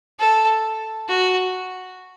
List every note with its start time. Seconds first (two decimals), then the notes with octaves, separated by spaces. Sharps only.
0.19 A4
1.08 F#4